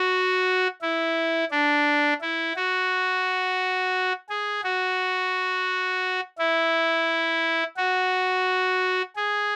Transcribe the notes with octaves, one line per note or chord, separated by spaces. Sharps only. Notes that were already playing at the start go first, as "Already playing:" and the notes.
Already playing: F#4
E4
D4
E4
F#4
G#4
F#4
E4
F#4
G#4